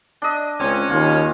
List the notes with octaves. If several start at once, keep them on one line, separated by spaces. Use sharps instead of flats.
D4 D#5
C#2 C4 C#4
D#2 F4